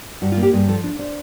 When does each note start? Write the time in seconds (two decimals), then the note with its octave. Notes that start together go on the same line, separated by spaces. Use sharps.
0.22 G2 F#4
0.32 F4
0.37 A#3
0.43 G4
0.53 G2 G#4
0.68 F3 A4
0.84 D4
0.99 D4 C5